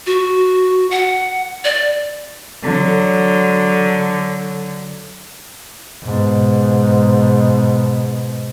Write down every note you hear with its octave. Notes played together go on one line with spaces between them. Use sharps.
F#4
F#5
D5
D3 F#3
G#2 B2